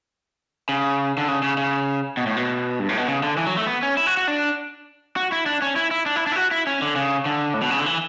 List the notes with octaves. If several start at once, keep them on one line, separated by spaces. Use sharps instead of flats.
C#3
D3
C#3
C#3
C#3
B2
A2
B2
G2
A2
B2
C#3
D3
E3
F#3
A3
B3
C#4
E4
F#4
F#4
D4
F#4
E4
D4
C#4
E4
E4
D4
E4
D4
E4
F#4
E4
C#4
D3
C#3
D3
A2
B2
C#3
D3
E3